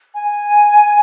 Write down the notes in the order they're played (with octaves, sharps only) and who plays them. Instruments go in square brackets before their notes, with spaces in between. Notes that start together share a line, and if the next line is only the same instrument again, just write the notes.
[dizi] G#5